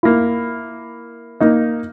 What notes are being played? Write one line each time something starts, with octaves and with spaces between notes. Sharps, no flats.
A#3 E4
A#3 D#4 D#5